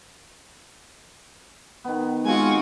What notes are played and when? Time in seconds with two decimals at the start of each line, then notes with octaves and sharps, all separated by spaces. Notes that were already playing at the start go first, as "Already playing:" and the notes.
1.84 D#3 B3
2.25 G#3 C4 F4 F#4 G#5 C#6